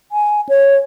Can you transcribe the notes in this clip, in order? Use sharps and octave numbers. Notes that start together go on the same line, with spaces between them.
G#5
C#5